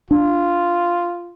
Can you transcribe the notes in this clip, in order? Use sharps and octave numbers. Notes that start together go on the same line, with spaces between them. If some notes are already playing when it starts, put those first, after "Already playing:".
D4 F4